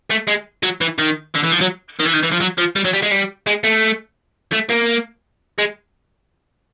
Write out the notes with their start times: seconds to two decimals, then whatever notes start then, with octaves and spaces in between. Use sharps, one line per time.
0.10 A3
0.28 G#3
0.63 F#3
0.81 E3
0.99 D#3
1.35 D3
1.43 E3
1.52 F3
1.61 F#3
2.00 D#3
2.05 E3
2.13 D#3
2.23 E3
2.31 F3
2.40 F#3
2.58 F3
2.76 G3
2.85 F#3
2.94 G3
3.03 G#3
3.11 G3
3.47 G#3
3.64 A3
4.52 A3
4.70 A#3
5.59 G#3